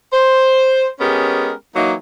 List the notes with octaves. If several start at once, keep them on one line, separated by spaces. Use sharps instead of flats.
C5
G#3 B3 C#4 G4 A#4
E3 F#3 A#3 D#4